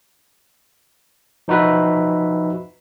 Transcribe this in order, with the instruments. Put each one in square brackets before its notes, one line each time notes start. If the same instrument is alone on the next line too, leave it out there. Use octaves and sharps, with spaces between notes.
[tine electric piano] F3 D#4 F#4 B4 E5